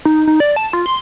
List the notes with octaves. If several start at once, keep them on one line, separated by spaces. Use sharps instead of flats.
D#4
D#4
D5
A5
F4
C6